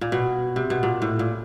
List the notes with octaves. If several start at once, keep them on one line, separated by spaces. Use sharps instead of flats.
A#2
B2
C3
B2
A#2
A2
A#2